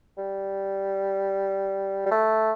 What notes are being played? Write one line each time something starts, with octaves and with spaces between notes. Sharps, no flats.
G3
G3
A3